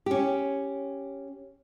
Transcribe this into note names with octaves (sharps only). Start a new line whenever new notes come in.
C#4 G4